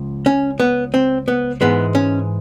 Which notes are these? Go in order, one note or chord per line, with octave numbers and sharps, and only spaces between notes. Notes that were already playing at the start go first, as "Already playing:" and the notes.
Already playing: C#2 F3
C#4
B3
C4
B3
G#2 E3 G#3 B3
C#4